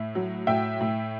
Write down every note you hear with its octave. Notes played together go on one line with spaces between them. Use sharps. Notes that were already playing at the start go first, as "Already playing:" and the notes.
Already playing: A2 E5
F#3
A2 E5 G5
A2